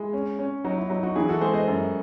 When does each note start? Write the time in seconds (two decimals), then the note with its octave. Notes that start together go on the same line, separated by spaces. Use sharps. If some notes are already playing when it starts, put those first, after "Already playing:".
Already playing: G#3 E4
0.13 C#4
0.39 C#4
0.64 F#3 D#4
0.78 E4
0.90 F#3 D#4
1.03 D#4 F#4
1.16 E3 E4 G#4
1.29 F#4 A4
1.41 G#3 G#4 C5
1.54 C5 D#5
1.67 F#2